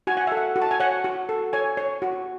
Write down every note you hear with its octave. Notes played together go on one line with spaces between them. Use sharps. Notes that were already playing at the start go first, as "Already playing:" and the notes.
F#4 G#5
F#5
A4 E5
F#5
F#4
A5
G#5
C#5 F#5
F#4
A4
C#5 G#5
C#5
F#4